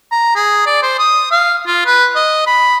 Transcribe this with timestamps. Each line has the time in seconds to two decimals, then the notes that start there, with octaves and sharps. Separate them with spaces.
0.12 A#5
0.35 G#4
0.67 D5
0.83 C5
0.99 D#6
1.32 F5
1.67 F4
1.86 B4
2.16 D#5
2.47 B5